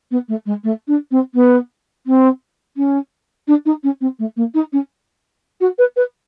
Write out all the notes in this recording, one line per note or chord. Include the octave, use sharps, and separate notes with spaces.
B3
A3
G#3
A3
D4
C4
B3
C4
C#4
D4
D#4
C#4
C4
A3
A#3
D#4
C#4
F#4
B4
B4